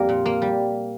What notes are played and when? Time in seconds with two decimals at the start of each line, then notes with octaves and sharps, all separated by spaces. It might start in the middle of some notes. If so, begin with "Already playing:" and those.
Already playing: F2 G3 A#3 G4 A#4
0.09 A#2
0.26 A#3
0.42 G3